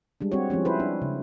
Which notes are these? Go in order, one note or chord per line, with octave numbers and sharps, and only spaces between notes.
G3 G#3 D4
G3 C4 F#4 G4 C#5
F3 G#3 C4 C#4
E4 B4 C5
D4
C#3